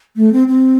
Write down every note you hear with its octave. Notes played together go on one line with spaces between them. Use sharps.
A3
C4
C4